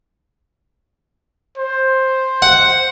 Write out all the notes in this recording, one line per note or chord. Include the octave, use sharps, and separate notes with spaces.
C5
F#5